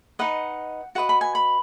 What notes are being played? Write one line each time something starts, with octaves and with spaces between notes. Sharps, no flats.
D#4 B4 D#5 F#5
F#4 B4 D#5 F#5
B5
G#5
B5